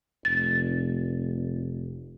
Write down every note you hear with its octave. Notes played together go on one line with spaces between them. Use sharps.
F1 A6